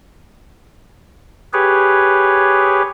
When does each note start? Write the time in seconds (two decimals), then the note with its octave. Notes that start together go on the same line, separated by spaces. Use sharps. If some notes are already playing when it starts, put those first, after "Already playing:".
1.53 G4 G#4 B4 C#5